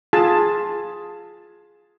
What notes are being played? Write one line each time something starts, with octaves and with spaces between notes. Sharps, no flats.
F4 G#4 A5